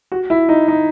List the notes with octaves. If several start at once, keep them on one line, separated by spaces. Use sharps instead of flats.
F#4
E4
D#4
D#4